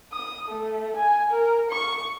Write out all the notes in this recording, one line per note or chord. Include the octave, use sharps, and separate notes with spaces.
D#6
A3
G#5
A#4
C#6